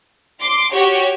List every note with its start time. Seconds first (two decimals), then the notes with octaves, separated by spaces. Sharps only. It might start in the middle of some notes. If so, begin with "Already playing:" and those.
0.40 C6 D6
0.73 F#4 G4 C#5 G5